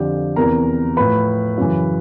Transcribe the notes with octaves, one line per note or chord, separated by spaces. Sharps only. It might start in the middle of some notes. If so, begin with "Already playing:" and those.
Already playing: F2 D3 F3 G4
E2 C3 E3 A#4 A#5
A2 F3 B4 B5
F#2 C#3 E3